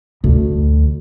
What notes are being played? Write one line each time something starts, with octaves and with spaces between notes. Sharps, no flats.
D2